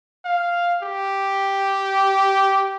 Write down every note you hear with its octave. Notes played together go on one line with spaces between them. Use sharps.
F5
G4